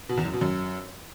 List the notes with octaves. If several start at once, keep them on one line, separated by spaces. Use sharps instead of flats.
B2
E2
F#2
B2
F#2